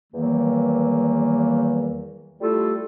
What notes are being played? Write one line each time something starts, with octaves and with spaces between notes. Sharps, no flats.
E2 D#3 E3 F#3 G3 A#3
G3 A3 E4 F4 G4 A4